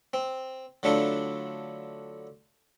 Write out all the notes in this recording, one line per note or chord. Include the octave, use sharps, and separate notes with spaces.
C4
D3 F#3 A3 D4 E4 F4